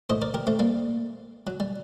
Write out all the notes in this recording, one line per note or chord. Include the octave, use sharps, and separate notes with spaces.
A2 C5 D#5
A#4 D5
G4 A#4
A3 C4
G3 A#3
F#3
G3